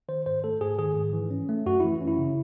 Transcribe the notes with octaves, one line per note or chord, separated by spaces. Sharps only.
D#3 C5
G#2 C5
A3 A4
G#2 G#4
D#3 G#4
G#2
E3
C#4
A3
F#2 F#4
E3 E4
C#4
E4
C#3